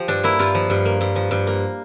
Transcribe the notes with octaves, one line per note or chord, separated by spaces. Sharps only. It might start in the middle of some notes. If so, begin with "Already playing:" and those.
Already playing: F3 G4
G2 D4
A#3 E4
G2 F4
F3
G2
A#3
G2
F3
G2
A#3